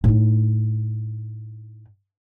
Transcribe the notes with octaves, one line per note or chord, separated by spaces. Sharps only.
A2 D#4